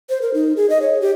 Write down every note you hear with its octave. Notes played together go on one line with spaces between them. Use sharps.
C5
A#4
D#4
G#4
D#5
C#5
G4